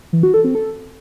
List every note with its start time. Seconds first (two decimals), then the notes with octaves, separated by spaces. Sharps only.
0.13 E3
0.23 F#4
0.34 A4
0.44 C4
0.55 A4